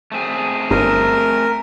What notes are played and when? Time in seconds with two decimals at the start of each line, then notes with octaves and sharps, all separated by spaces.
0.12 A3 C4 G#4
0.71 G1 A#4